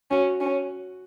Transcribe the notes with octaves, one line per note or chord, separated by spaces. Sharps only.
C#4 F#4
C#4